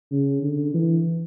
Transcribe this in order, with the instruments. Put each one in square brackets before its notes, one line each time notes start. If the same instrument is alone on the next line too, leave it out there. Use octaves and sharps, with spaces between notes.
[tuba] C#3
D3
E3